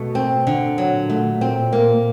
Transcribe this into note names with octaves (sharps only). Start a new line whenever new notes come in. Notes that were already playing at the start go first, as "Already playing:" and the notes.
Already playing: B2 A3
C4
D3
A#2 F#3
A3
C4
A#3